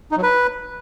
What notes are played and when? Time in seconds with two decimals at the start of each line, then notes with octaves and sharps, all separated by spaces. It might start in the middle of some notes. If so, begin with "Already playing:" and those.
0.12 D#4
0.17 F#3
0.23 B4